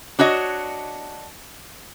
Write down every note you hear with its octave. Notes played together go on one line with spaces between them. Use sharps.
D4 F#4 C#5 D#5